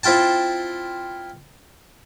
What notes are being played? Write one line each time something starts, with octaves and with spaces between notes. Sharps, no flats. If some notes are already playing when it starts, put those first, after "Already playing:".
C4 E4 F4 G5 A5